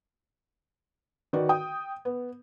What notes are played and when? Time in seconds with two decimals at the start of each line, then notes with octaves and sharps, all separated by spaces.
1.33 D#3 F#4 B4 D5
1.49 G5 D#6
2.05 B3